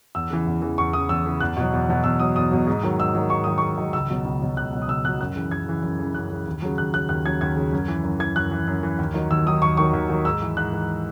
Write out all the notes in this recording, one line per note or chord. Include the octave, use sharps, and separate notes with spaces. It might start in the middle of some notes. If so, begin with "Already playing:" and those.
E2 E6
C#3 E3
E2
C#3 E3
E2 C#6
C#3 E3 D#6
E2 E6
C#3 E3
E2 F#6
B2 F#3
E2
B2 F#3
E2 E6
B2 F#3 D#6
E2 D#6
B2 F#3
G#2
D#3 F#3
G#2 E6
D#3 F#3
G#2 C#6
D#3 F#3 D#6
G#2 C#6
D#3 F#3
C#2 E6
B2 F#3
C#2
B2 F#3
C#2 F#6
B2 F#3
D#6
C#2 E6
B2 F#3 F#6
F#2 F#6
C#3 E3
F#2 G#6
C#3 E3
F#2
C#3 E3
F#2 F#6
C#3 E3
D#2
C#3 F#3
D#2 F#6
C#3 F#3 F#6
D#2 F#6
C#3 F#3 G#6
D#2 G#6
C#3 F#3
F#2
E3
F#2
E3 G#6
F#2 F#6
E3
F#2
E3
D#2
D#3 F#3
D#2 E6
D#3 F#3 D#6
D#2 C#6
D#3 F#3 C#6
D#2
D#3 F#3
G#2 E6
E3
G#2 F#6
E3